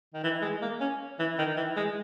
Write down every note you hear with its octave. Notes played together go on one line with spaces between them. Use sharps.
D#3
E3
G#3
A#3
C#4
E3
D#3
E3
G#3